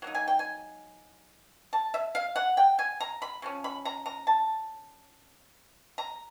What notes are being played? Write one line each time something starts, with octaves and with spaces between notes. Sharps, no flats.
F#3 A#3 D#4
G#5
G5
G#5
A5
E5
F5
F#5
G5
G#5
A#5
B5
C#3 F3 C#4
B5
A#5
A#5
A5
A#5